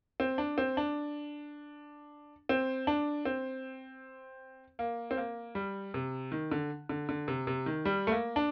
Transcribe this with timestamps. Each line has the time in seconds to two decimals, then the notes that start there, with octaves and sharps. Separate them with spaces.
0.20 C4
0.38 D4
0.58 C4
0.77 D4
2.49 C4
2.87 D4
3.25 C4
4.79 A#3
5.11 C4
5.17 A#3
5.55 G3
5.94 C3
6.32 D#3
6.52 D3
6.89 D3
7.09 D3
7.28 C3
7.47 C3
7.66 D#3
7.85 G3
8.07 A3
8.12 A#3
8.36 D4